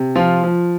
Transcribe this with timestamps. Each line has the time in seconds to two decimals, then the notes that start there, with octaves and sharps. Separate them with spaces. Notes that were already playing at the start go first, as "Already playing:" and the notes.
Already playing: C3
0.15 F3 F4
0.44 F3